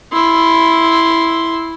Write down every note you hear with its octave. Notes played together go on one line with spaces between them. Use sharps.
E4 C6